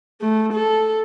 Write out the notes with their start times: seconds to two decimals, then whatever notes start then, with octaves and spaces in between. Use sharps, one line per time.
0.21 A3
0.53 A4